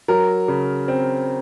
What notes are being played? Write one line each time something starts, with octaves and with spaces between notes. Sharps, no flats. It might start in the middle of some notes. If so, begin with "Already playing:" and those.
F#3 A#4
C#3
C4